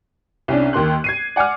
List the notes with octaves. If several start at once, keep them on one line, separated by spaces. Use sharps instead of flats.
C2 C#4 D4
D#2 A#3 C6 F#6
G#6 C7 D#7
D5 F#5 G#5 D6 F6